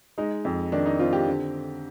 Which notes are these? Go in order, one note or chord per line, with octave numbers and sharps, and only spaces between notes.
G#3 D#4
F2
D#3 D4
D#4
C4 F4
G4
D3